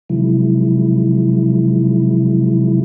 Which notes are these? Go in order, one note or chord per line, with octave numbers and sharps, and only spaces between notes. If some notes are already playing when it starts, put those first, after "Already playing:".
C3 D#3 F3 F#3 G#3 E4